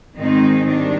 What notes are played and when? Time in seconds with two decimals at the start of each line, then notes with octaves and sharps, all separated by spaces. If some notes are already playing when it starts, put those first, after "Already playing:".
0.16 G#2 D#3 G#3 C4 D#4
0.66 D#3 G3 D4